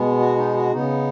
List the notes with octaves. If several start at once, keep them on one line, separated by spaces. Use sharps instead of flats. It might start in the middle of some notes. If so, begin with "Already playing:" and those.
Already playing: B2 G#3 B3
F#4
D#4
F#4
C#3 B3 D#4